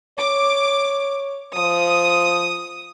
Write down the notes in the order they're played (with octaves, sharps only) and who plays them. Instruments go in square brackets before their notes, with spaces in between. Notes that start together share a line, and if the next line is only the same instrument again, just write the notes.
[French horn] C#5 [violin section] D6
[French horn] F3 [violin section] D#6